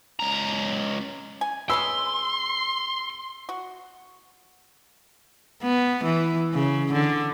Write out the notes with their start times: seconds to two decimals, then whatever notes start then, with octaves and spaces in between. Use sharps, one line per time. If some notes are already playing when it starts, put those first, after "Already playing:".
0.19 C#2 A#5
1.41 G#5
1.70 G#3 C#4 B4 C6 E6
3.49 F#4
5.63 B3
6.04 E3
6.54 C#3
6.93 D3